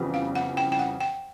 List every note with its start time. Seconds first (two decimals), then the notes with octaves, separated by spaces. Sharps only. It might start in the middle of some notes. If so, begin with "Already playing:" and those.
Already playing: F2 C#3 E3 G3 B3
0.14 F5
0.35 F#5
0.57 G5
0.72 G5
0.79 F#5
1.00 G5